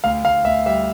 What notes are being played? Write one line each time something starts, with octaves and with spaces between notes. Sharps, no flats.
D2 F5
D2 F5
D2 E5
G3 E5